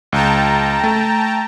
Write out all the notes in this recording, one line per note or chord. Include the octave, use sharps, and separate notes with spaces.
C#2 G5 A5 A#5
A3